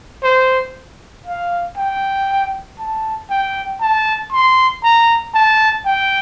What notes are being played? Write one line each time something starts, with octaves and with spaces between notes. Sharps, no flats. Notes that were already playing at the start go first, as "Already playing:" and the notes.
C5
F5
G5
A5
G5
A5
C6
A#5
A5
G5